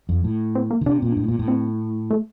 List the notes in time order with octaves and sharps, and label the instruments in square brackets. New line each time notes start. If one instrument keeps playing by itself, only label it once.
[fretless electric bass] F2
A2
[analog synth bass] C4
A#3
[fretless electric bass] D3
[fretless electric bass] C3 [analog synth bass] D4
[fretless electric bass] A#2 [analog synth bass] C4
[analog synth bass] D4
[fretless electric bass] A2
A#2
A2
[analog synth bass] C4
A3